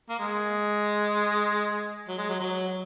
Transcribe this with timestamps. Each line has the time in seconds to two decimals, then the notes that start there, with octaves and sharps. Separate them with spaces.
0.09 A#3
0.19 G#3
2.08 F#3
2.18 G#3
2.29 F#3
2.40 F#3